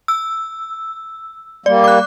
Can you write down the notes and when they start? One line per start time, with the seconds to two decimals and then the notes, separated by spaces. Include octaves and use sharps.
0.08 E6
1.66 G3 A#3 D5
1.84 D6 F#6